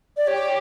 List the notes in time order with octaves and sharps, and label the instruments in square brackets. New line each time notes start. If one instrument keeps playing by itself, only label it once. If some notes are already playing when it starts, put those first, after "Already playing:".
[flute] D5
[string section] G4 [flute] C#5